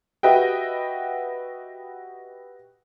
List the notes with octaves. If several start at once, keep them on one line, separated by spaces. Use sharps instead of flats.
F#4 G4 B4 D#5 E5 G5